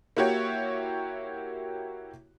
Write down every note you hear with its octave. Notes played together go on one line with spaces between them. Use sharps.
A#3 E4 F#4 G4 C#5